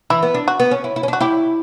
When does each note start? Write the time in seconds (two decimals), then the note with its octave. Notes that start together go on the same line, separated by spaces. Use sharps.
0.10 E3 E4
0.23 B3
0.34 D4
0.48 F#4
0.60 B3
0.71 C#4
0.84 E4
0.96 E4
1.03 C#4
1.08 D4 F#4
1.20 E4 G4